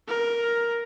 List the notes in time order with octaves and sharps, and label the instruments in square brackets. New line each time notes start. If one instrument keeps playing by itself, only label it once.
[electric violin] A#4